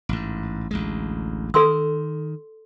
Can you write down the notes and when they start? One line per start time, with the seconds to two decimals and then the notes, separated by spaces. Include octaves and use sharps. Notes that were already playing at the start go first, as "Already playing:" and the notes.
0.09 A1 G#2
0.71 A1 D2 G#3
1.54 D#3 A4 C6 E6